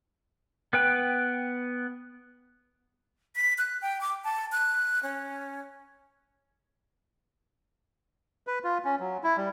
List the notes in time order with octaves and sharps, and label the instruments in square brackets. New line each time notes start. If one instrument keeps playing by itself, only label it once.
[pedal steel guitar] B3 B4 G5
[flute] B6
F#6
G5
D6
A5
F#6
C#4
[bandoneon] B4
F4
C#4
F#3
E4
G3